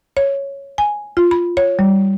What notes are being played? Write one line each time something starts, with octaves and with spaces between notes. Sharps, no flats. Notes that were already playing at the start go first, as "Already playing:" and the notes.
C#5
G#5
F4
B5
C#5
G3